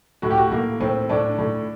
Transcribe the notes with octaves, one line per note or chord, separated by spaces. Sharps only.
A2 F#4
G4
F#4
A2 A#3
A2 C4
A2 D4
A2